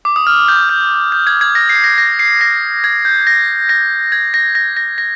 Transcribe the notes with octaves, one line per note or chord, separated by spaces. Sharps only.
D6
D#6
F6
G6
G6
G6
G#6
G#6
A#6
C7
A#6
A#6
C7
A#6
G#6
G6
A#6
A#6
G#6
A#6
A#6
A#6
A#6